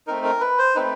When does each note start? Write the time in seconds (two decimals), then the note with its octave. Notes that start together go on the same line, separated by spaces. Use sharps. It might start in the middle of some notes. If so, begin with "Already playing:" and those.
0.07 A3 C4 D#4 A#4
0.24 A#4
0.41 B4
0.58 C5
0.75 A3 C4 D#4 B4